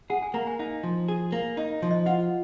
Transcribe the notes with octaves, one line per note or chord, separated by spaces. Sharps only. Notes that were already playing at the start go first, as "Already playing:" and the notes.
G#4 F#5
G#5
A#3 A#5
G#5
D#4 F5
F3
G#4
A#3
D#4 D#5
F3
D#5
F4 F#5